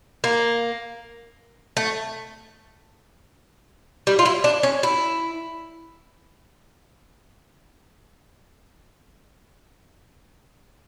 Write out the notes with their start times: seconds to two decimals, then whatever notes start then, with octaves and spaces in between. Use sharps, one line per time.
0.24 A#3
1.77 A3
4.07 G3
4.19 F4
4.26 E4
4.44 D4
4.63 C#4
4.83 E4